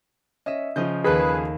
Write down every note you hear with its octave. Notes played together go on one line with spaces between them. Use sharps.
C#4 D#5 E5
C#3 F3 D#5 G6
D#2 G#4 A4 B4 B5